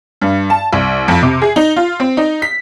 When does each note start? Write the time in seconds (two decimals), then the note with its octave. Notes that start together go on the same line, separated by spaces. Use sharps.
0.22 G2
0.50 A5
0.73 C2
1.08 F2
1.23 C3
1.42 G#4
1.56 D#4
1.76 F4
2.00 C4
2.17 D#4
2.42 B6